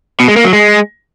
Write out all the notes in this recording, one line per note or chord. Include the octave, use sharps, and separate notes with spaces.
B2
G#3
A#3
F#3
G#3